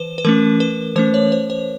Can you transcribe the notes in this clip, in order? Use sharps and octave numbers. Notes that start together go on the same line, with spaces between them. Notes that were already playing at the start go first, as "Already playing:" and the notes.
Already playing: E3 B4 C5
B4
E3 A3 C#4 A#4
B4
E3 A3 C#4 C5
C#5
C5
C5